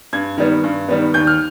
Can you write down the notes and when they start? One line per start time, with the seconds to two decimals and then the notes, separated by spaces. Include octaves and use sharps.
0.13 G2 G#6
0.38 D#3 G3 B3
0.64 G2
0.89 D#3 G3 B3
1.14 D#2 G6
1.27 F6